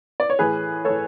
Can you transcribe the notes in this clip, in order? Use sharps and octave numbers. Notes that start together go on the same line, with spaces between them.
D5
C#5
A2 E3 G#4 B4
A2 E3 A4 C#5